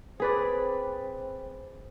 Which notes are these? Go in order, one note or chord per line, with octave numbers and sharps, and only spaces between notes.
C4 G#4 B4 D5